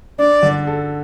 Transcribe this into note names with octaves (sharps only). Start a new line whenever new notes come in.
D4 D5
D3
A4